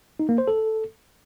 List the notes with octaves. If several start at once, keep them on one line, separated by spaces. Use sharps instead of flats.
D#4
A#3
C5
A4